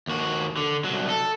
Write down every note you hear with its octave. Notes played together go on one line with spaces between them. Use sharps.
D#2 F#4
D3
C2 F#3
A4